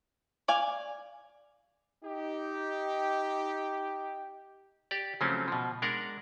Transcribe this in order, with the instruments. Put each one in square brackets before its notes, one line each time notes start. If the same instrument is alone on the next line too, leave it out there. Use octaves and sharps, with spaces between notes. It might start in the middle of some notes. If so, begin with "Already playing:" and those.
[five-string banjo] D5 F5 G#5
[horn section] D#4 G4
[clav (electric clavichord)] G4 D5
C#3 F3 F#3 A3 C4 C#4
B2 F3
G#3 D4 A#4 F#5